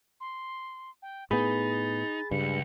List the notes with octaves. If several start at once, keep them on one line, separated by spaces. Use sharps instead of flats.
C6
G5
A2 B3 D#4 G#4 B5 A6
C#2 G2 C#7